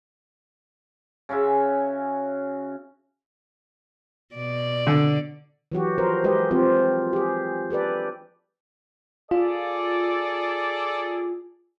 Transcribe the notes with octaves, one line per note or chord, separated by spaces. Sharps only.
C#3 C#4 F#4 E5
B2 D5
D3
E3 F#3 F#4 G4
F3 A#4 C5
G#3 G4 A#4 B4 D#5
F3 C4 F4 G4
G4 G#4
G4 A4 B4 D5
F4 G#4 A4 D5